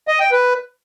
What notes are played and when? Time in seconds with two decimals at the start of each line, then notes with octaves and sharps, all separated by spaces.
0.08 D#5
0.20 G5
0.31 B4